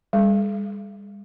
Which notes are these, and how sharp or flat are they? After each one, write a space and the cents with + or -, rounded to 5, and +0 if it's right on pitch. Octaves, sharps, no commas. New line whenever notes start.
G3 +45 A4 -40